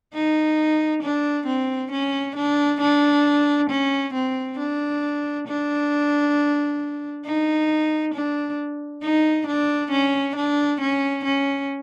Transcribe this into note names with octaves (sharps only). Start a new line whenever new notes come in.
D#4
D4
C4
C#4
D4
D4
C#4
C4
D4
D4
D#4
D4
D#4
D4
C#4
D4
C#4
C#4